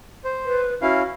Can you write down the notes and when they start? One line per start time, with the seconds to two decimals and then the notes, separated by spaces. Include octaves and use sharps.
0.25 C5
0.45 B4
0.82 C#4 E4 F#4 F5